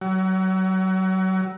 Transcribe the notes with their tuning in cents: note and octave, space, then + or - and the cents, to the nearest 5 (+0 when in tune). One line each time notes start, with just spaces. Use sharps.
F#3 +30